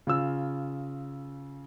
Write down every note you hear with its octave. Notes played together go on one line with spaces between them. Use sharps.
C#3 F4 E6